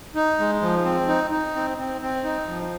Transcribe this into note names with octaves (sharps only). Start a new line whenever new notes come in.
D#4
G#3
F3
C4
D#4
D#4
C4
C4
C4
D#4
F3